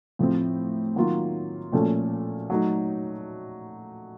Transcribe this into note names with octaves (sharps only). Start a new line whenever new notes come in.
A2 F3 A3 C4
D#3 F#3 A#3 F4
A#2 F3 A3 C#4 A4
F#3 A3 D#4